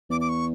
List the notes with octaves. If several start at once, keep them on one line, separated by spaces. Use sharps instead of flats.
E2 D6
D6
C#6